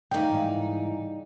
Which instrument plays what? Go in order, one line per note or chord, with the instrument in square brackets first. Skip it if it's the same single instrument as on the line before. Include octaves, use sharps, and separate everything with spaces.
[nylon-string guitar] D2 [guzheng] C#3 A#3 B5 [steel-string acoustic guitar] G3 D#4 [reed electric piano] G5
[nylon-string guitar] G#2 E3